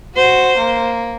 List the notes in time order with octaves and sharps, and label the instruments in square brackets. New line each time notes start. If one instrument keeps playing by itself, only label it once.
[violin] F#4 [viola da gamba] C5
[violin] A#3